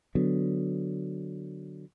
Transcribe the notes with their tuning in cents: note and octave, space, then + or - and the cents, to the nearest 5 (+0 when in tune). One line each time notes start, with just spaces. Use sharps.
D3 +0 F#3 +0 B3 +10